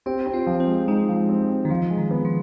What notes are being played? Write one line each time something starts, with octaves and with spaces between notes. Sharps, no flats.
C4 G4
C4
F4
F3
C4
G#3
G#3 D#4
F3
C4
C4
D#3
F3 F4
G#3
D#3
B3
F3